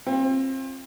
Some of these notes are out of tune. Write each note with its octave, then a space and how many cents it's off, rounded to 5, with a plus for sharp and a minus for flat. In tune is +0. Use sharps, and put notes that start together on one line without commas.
C4 +30 F4 +0